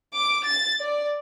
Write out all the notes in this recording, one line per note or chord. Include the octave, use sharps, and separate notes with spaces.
D6
A6
D5